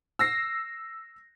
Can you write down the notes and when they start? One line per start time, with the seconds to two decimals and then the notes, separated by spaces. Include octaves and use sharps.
0.19 E6 A#6 C7